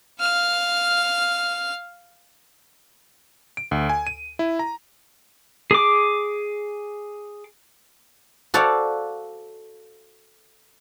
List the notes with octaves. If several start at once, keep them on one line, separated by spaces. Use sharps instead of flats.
F5 F6
D7
D2
G#5
D#7
E4
A#5
G#4 D6
F#4 A4 C5 D5 F5 F#5